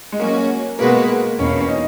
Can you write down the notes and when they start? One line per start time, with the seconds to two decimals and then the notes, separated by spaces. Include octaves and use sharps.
0.12 G#3
0.20 F#3 A#3 C#4 F#4
0.79 B2 G#3 A#3 B3 F#4 B4
1.09 A#3
1.39 E2 B2 A#3 C#4
1.61 C#4
1.68 D#4